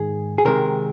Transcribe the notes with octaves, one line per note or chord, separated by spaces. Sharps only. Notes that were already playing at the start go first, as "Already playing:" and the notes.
Already playing: G#2 D#3 G#3 G#4
G#4
C3 D#3 G#3 C4 A#4